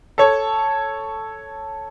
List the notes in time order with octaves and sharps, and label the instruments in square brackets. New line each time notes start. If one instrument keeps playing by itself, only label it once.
[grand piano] A4 C#5